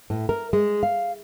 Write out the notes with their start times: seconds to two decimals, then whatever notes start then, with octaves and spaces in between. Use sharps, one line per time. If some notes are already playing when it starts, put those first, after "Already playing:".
0.10 A2
0.29 A#4
0.53 G#3
0.83 F5